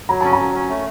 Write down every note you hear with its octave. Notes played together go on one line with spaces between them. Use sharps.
F#3 A#5
C#4 A5
A#5
F#3
C#4
A3